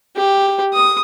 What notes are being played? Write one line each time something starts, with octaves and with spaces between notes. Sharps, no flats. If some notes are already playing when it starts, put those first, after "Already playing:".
G4
D#6